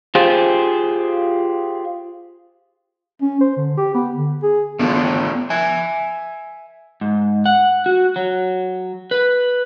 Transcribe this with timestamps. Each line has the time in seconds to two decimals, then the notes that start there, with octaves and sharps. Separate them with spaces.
0.15 F4 G4 G#4 C5
3.22 C#4
3.41 C5
3.57 D3
3.77 G4
3.94 B3
4.16 D3
4.43 G#4
4.79 A3 B3 D4 F4 F#4 A4
5.50 E5 G#5
7.01 G#2
7.46 F#5
7.86 F#4
8.16 F#3
9.11 B4